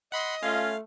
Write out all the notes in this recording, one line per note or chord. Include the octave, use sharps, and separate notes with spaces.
D#5 F#5 B5 C6
A3 C#4 F4 F5